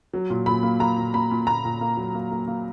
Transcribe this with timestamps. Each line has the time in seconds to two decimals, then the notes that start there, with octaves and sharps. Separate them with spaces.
0.14 F#3
0.30 A#2
0.46 A#2 B5
0.63 A#3
0.80 A#3 A#5
0.97 A#2
1.14 A#3 B5
1.31 A#2
1.47 A#2 A#5
1.65 A#2
1.81 A#3
1.97 F#3
2.14 A#3
2.32 A#3
2.47 A#3